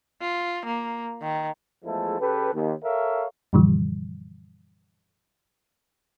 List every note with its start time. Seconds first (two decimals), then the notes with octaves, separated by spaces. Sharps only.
0.22 F4
0.66 A#3
1.22 D#3
1.85 E2 F3 G#3 A3 E4 A4
2.20 C#3 G4 A4 B4
2.53 D#2
2.84 A4 A#4 C#5 E5 F5
3.53 F#2 A#2 D3 E3 F3 G3